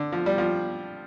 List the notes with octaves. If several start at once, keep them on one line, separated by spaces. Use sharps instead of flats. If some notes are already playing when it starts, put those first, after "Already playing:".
Already playing: D3
F3
G3
F3